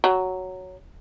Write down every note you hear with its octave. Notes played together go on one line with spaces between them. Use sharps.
F#3